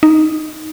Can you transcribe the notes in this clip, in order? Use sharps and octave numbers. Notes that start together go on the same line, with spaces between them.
D#4